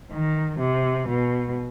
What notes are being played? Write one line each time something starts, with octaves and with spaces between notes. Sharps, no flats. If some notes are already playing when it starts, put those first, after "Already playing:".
D#3
C3
B2